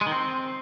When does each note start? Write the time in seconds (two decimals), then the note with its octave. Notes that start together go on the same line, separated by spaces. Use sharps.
0.01 G#3
0.06 D#3
0.12 C4